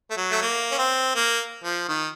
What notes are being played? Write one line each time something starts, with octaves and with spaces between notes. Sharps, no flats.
A3
F#3
A3
A#3
C#4
C4
A#3
F3
D#3